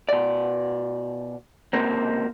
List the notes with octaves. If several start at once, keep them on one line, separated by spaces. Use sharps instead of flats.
B2 D5
C#2 C3 A#3 C4